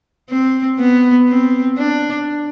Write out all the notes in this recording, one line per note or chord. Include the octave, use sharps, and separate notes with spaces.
C4
B3
C4
D4